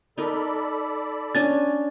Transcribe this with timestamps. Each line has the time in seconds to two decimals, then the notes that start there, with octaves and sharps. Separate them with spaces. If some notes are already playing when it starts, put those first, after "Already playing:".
0.18 D#4 A4 A#4 D5 B5
1.35 C#4 D4 G#5 A6